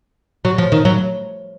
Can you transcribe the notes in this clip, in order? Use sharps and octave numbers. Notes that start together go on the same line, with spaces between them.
F#3
F3
D#3
F#3